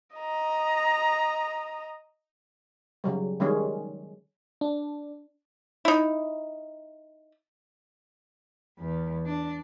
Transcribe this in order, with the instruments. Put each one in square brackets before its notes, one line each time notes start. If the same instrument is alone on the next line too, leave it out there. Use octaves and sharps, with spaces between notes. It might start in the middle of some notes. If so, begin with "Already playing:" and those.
[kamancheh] D#5 A#5
[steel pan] C#3 F#3 G3
D#3 G3 G#3 C#4 G#4
[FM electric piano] D4
[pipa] D#4 E4
[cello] E2
D4